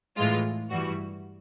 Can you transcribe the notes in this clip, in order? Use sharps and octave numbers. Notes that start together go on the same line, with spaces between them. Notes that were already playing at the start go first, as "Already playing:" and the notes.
A2 E3 G#3 F4
G2 E3 G3 F#4